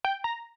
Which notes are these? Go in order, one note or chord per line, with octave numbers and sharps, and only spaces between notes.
G5
A#5